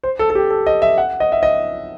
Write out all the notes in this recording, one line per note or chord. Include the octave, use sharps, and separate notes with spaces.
C5
A4
A4
G4
A4
D#5
E5
F#5
D#5
E5
D#5